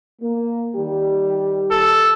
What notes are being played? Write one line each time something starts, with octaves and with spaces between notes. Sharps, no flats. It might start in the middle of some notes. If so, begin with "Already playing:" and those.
A#3
D#3 G3 G4
A4